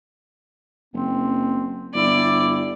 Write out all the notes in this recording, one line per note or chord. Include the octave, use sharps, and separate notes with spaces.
F#1 C4
G1 E4 D5